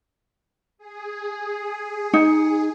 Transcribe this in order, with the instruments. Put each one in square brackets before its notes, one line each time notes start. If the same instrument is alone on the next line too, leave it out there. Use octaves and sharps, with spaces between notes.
[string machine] G#4
[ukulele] D#4